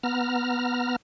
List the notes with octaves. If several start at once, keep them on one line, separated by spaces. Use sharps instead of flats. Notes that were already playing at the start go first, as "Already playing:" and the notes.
B3 A#5 F6